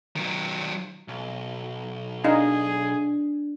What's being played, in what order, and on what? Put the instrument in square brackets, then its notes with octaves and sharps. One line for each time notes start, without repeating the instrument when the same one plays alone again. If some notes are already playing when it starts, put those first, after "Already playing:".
[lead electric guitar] D#3 F#3
B1
[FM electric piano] D4 [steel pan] D#4 F5 [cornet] G#4